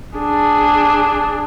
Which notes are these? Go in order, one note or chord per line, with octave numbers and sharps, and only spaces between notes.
D4 G#4